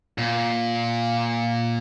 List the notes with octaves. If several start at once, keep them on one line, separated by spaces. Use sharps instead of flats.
A#2